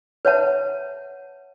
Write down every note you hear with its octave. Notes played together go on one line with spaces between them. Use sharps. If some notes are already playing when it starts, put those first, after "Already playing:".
B4 C#5 E5 F#5 A5